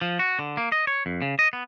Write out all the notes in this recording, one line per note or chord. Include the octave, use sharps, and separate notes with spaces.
F3
F#4
D3
A#3
D#5
C#5
F2
C#3
D#5
B3